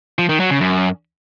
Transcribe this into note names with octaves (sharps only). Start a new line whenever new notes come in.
F3
D#3
F#3
C#3
F#2